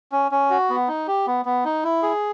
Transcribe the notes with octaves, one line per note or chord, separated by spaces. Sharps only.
C#4
C#4
F#4
B3
D#4
G4
B3
B3
D#4
E4
G#4